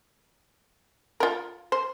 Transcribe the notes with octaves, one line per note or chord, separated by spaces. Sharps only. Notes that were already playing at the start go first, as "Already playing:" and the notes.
F4 A#4
C5